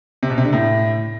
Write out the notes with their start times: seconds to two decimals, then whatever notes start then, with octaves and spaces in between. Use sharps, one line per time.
0.23 C3
0.30 B2
0.38 C3
0.45 D3
0.53 A2